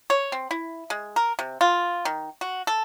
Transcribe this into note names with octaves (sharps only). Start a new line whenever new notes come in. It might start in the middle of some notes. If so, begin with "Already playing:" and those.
C#5
C4
E4
G#3
A#4
C3
F4
D#3
F#4
A4